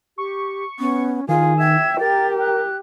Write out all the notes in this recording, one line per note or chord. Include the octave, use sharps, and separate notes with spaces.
G4 C#6
B3 C#4
D#3 F4 G#4 F5
E5 G5 G#6
G4 A#4 A6
F#6